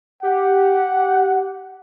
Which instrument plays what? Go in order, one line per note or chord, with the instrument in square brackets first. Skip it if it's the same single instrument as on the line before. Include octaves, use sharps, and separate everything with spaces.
[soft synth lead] G4 [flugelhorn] F#5